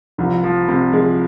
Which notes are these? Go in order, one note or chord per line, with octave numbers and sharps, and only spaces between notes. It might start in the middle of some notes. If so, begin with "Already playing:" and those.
C2 F3
F3
C3
F3 G#3